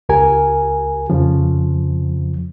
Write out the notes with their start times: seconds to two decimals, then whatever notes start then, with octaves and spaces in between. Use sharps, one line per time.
0.09 C#2 G4 A#4 G#5
1.10 F2 C#3 F3